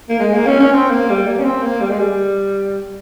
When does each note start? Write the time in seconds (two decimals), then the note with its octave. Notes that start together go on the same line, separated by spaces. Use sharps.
0.09 A#3
0.20 G#3
0.33 A#3
0.47 C#4
0.60 C#4
0.73 C4
0.91 A#3
1.10 G3
1.27 A#3
1.39 C#4
1.44 C4
1.63 A#3
1.81 G3
1.90 G#3
1.99 G3